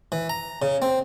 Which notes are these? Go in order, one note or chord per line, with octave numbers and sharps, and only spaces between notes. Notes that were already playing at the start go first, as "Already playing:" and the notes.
E3
A#5
C#3
C4